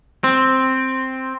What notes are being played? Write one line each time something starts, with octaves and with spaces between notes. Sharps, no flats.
C4